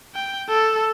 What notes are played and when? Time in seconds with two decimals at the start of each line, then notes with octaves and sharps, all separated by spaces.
0.15 G5
0.49 A4